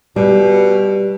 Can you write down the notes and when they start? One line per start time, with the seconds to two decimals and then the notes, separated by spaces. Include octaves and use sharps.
0.16 B2 G3